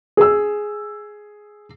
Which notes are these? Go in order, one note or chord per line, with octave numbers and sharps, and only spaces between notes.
G#4 E6